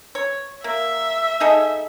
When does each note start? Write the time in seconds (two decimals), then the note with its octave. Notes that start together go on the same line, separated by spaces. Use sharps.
0.15 C#5
0.64 A#3 E5
1.40 D#4 G#4 A4